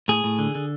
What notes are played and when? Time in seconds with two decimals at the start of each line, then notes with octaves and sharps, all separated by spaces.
0.08 A2 G#4
0.24 A2
0.39 D3
0.55 D3